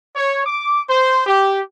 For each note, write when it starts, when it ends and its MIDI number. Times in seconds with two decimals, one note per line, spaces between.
0.16 0.43 73
0.46 0.81 86
0.90 1.23 72
1.27 1.61 67